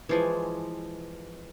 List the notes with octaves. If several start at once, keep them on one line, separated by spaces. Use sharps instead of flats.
E3 F3 G#3